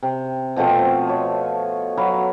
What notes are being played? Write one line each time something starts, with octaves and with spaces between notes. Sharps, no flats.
C3
B2 F3 A3 C4
C#5
F#3 F5 B5